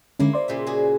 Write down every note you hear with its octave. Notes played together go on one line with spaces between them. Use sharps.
D3 G#3 A#3 C#4 E4
C5 D5 C6
A#2 C#3 E5
F#4 G#4